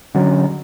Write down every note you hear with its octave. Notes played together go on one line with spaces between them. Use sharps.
D3 F#3 C#4